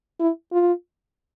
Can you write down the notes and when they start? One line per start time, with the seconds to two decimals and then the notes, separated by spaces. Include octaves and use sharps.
0.20 E4
0.52 F4